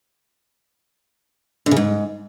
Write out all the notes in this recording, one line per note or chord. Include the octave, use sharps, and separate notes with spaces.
D3
C#3
G#2